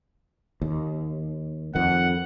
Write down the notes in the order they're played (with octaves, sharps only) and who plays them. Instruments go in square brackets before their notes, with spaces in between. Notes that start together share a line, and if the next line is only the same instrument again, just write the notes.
[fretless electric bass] D#2
[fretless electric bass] F2 D#3 [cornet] F#5